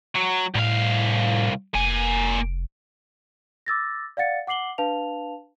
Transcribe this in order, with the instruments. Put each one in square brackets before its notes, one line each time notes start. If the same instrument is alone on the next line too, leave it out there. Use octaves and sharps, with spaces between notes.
[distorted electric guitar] F#3
[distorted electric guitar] C2 F5 [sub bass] A2
[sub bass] F1 [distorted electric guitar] A#3 G#5
[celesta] D6 E6 A6 A#6
D5 F5 F#5 A6 C#7
F#5 D6 C7 F#7 G7
D4 B4 F5 A5 F7